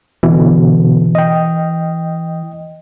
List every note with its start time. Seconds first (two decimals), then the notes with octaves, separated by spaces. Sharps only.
0.23 B2 D3 E3
1.15 D#5 G5